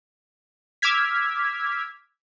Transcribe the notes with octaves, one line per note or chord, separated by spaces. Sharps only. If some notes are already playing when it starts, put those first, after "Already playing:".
D6 E6 F6 G#6 B6